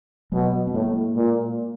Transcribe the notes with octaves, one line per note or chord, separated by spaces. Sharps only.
B2 F#3 G#3
B3
A2 G#3 A#3
A#2